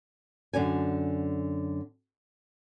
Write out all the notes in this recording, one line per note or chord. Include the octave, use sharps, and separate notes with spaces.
F#2 D3 D5 G#5